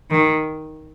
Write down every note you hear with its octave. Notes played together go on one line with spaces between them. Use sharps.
D#3